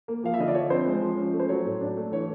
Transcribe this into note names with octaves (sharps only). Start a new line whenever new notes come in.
A#3
F3 F5
E5
D3 D#5
D5
F3 C#5
C4 C5
G#3
F3
C#4
A3
C5
F#3 C#5
A2
D4
A3
E3 C#5